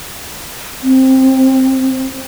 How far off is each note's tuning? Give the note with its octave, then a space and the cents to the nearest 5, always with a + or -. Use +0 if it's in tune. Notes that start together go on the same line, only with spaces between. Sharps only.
C4 +10